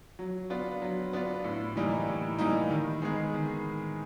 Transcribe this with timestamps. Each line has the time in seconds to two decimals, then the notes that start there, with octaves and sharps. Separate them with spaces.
0.19 F#3
0.50 B3 D4 F4
0.82 F#3
1.13 B3 D4 F4
1.44 A2
1.76 E3 G3 A#3 D#4
2.08 A2
2.39 E3 G3 A#3 D#4
2.70 D#3
3.02 G#3 B3 D#4 G#4
3.34 D#3